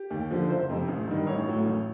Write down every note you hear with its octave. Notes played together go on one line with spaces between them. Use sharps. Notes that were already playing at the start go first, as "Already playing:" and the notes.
Already playing: G4
D#2
D3 F3
F#1 C5
F2 C3
A1
G2 D#3
A1 C#5
A2 F#3
A1